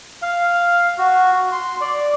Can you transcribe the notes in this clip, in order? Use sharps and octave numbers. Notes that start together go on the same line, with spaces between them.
F5
F#4
C6
D5